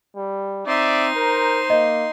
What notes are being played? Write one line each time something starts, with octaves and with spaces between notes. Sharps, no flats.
G3
C4 D#4 D5 E5 C6
A#4 C5
A#3 D#5